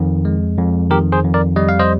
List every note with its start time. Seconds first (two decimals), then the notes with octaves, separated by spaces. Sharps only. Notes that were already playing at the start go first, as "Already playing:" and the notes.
Already playing: F2 D#3
0.25 G#3
0.59 F2
0.90 D#3 G4 A#4
1.12 G#4 C5
1.24 F2
1.34 A#4 D5
1.56 G3 D#5
1.69 F5
1.79 C5 D#5